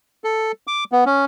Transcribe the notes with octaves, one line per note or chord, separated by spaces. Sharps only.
A4
D6
B3
C#4